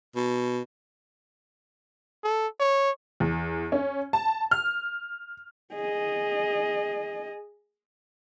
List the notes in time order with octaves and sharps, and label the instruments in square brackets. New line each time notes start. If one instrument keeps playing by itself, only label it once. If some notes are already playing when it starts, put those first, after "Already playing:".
[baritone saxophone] B2
[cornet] A4
C#5
[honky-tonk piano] E2
C#4
A5
F6
[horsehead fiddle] G#4 D#5